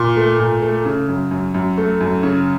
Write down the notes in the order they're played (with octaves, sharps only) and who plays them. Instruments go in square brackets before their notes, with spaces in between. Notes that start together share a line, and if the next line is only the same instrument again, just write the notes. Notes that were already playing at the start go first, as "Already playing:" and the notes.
Already playing: [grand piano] A#2
A3
A#2
A3
C#3
F#2
F#2
F#2
A3
F#2
C#3